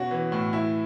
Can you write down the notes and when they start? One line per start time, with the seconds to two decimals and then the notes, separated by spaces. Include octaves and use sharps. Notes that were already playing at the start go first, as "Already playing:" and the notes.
Already playing: B2 C#4 F#4
0.11 E3
0.32 A2
0.53 E4